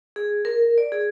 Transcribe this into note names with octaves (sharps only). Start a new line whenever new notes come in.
G#4
A#4
D5
G#4